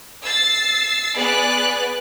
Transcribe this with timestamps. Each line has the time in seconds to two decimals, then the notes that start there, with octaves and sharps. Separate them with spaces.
0.24 E6 A6 C7
1.15 B3 G#4 D5 F#6